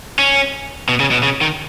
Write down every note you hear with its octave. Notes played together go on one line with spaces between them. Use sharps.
C#4
B2
C#3
B2
C#3
D#3